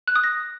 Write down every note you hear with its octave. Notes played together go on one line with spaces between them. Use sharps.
F#6
D#6
A#6